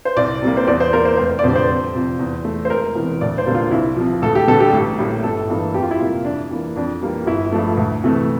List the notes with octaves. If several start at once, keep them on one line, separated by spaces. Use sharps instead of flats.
C5
C2 D5
C3 G3 A#3
C5
E2 D5
C5
E3 A#3 A#4
C5
F1 C5
D5
F2 D3 G3 C5
C5
F2
C3 F3
E2
E3 A3
C5
E1 A#4
E2 C3 E3
D2 D5
C5
D3 G3 A#3
F4
C2 E4
C3 F3
D2 A4
G4
D3 G3 A4
G4
A1
A2 G3 A#3
G1 A4
G2 E3 A#3
F2 G4
F4
E4
C3 G3 A#3 F4
F2 D4
E3 A#3
F2 D4
E3 G3 A#3
G1 E4
G2 F3 A3
D2
C3 E3 A3